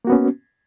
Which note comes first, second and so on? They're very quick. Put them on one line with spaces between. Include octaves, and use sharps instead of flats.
A#3 F#4 B3 C#4